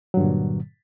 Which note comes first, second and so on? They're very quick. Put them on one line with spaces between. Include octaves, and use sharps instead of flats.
F#3 G2 D3 A#2